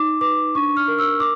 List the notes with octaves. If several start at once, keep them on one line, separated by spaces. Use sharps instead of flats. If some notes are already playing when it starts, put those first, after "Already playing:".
Already playing: D#4 D6
B4 D6
D4 C#6
F6
A#4
E6
D6